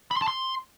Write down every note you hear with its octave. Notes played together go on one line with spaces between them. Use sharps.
B5
C6
A5
C6